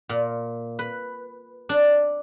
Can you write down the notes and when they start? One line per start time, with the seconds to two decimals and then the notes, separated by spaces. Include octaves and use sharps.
0.09 A#2
0.79 B4
1.69 D4